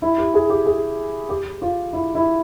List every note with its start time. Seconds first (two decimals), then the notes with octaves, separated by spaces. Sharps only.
0.02 E4
0.18 G4
0.34 G#4
0.50 G4
0.66 G#4
1.29 G4
1.62 F4
1.93 E4
2.15 E4